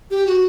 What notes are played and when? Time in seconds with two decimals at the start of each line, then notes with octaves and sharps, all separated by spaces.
0.11 G4
0.27 F#4